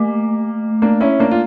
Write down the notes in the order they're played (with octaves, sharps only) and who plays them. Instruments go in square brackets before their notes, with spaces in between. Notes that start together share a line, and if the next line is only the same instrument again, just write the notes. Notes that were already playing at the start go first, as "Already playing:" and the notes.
Already playing: [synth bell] A3 [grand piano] A#3
[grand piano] A#3 D4
C#4 E4
A#3 D4
F4